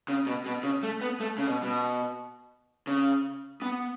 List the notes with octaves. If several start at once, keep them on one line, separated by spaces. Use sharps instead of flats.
C#3
B2
B2
C#3
A3
B3
A3
C#3
B2
B2
C#3
B3